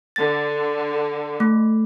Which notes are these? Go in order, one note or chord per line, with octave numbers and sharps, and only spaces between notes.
D3 A6
A3